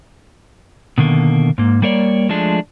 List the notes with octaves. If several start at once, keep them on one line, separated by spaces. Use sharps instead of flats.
B2 D3 D#3 A#3
G#2 A#3
G3 A#3 A#4 C#5 D5
F3 G#3 A3 D4